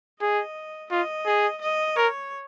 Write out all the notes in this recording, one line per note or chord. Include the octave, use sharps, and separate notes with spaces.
G#4 D#5
F4 D#5
G#4
D#5
A#4 C#5